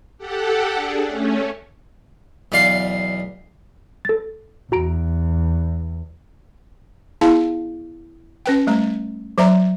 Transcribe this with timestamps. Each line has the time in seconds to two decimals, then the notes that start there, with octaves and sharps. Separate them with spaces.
0.18 G4 A4 F#5
0.74 D4 G#4
1.04 A3 C#4
2.52 B1 E2 D5 F5 C6
4.05 A4 A6
4.72 E2 F#4 A#5 D7
7.21 B3 E4 G#4 F5 A5
8.46 C#4 B4 G5
8.67 G3 A3 A#5
9.38 F#3 C5 D5 E5 A#5